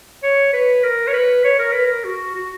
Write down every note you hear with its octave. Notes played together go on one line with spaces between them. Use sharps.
C#5
B4
A#4
C#5
B4
C#5
A#4
B4
A#4
F#4
F#4